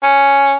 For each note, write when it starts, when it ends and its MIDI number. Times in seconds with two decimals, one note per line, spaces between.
0.03 0.54 61